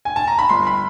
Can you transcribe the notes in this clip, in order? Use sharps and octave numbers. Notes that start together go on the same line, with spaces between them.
G#5
A5
A#5
B5
G1 C6
B5